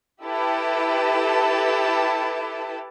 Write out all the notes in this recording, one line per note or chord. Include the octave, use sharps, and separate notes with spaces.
E4 G4 A4 B4 A5